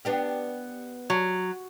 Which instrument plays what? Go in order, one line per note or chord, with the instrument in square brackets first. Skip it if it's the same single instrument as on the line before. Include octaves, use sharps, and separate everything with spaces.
[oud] B3 D4 G4
[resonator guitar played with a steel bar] F#3